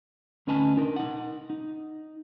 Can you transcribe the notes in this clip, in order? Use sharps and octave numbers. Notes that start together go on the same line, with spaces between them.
D2 C#4 D#4 B4 G#5 A5
D4 D#4 A#4
D#4 F#5
D#4